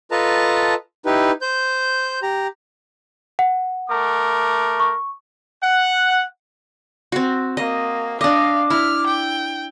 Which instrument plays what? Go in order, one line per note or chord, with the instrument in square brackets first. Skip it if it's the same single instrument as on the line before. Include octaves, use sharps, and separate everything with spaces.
[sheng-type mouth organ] F4 A4 B4 D#5 A5 A#5
D#4 E4 G4 B4
C5 G6
G4 A#5
[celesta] F#5
[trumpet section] A3 A#4 D6
[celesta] C#6
[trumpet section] F#5
[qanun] C4 F#4
[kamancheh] A#3 [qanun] D#5
[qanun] D4 D#5 [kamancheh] F5 [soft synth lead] D6
[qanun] E4 [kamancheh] F6
[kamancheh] G5